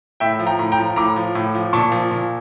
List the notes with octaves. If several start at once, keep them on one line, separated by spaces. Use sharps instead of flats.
A2 E5 G5
F3
G5 A#5
A2
G5 A#5
F3
A2 A#5 D6
F3
A2
F3
A#2 A5 C#6
F3
A#2